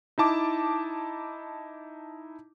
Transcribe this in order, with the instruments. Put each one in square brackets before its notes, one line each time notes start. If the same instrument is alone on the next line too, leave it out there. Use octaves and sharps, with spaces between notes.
[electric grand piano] D#4 E4 A5 D6